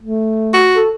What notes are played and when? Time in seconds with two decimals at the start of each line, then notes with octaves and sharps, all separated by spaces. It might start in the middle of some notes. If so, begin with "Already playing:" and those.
0.02 A3
0.54 F#4
0.75 A4